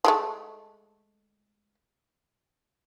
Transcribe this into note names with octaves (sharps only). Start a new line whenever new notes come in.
F3 G#3 A3